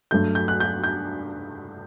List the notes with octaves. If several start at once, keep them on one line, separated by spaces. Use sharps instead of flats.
G2 F#3 A3 G6
G6
F#6
G6
G6